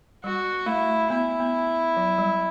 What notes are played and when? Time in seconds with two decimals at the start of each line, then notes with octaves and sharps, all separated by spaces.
0.24 G3 F#4
0.66 A3 E4
1.10 B3 E4
1.40 B3
1.97 F#3
2.18 G3